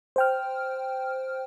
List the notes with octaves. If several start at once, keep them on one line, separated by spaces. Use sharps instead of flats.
C5 G5 F6